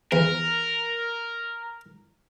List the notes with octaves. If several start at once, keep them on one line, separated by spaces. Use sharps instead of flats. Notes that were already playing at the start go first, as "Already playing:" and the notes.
E2 A#4